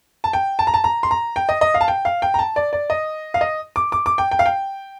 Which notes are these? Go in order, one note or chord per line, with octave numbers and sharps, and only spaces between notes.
A5
G5
A5
A#5
A5
A#5
C6
A#5
G5
D#5
D#5
F5
A5
G5
F5
G5
A#5
A5
D5
D5
D#5
F5
D#5
D6
D6
D6
G5
G5
F5
G5